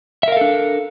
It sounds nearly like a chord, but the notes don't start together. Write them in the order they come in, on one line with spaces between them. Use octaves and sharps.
E5 A#4 F5 A4 D4